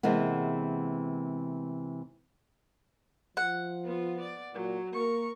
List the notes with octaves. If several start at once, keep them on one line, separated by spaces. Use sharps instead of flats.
C3 E3 G#3 A#3 B3
F3 F#5
B3 F4
D5
A#2 F#3
A#3 A#4 C#6